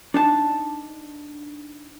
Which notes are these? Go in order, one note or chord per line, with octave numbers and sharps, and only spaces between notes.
D4 D#4 A5